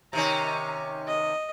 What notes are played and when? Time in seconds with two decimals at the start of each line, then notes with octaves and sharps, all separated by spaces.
0.13 C3 D#3 C#4 A#5
1.07 D#5